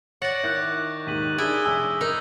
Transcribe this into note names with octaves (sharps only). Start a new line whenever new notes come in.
C#5 D5 F#5 C#6 A6 A#6
D#3 E4 D6 F#6 G6
D#2 G#2 B6 D#7 F#7
D#3 D4 E4 G#4 E6 D#7 G7
F1 G#5 E6
D#4 A#4 F7